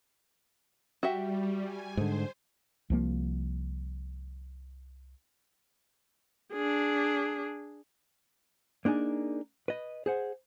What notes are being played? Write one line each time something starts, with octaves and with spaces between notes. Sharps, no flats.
G3 F#4 G4 E5
G#5
G#2 D3 C5
C2 F3 A#3
D4 G#4
A#3 D4 D#4 G#4
B4 D#5
G#4 C5 F#5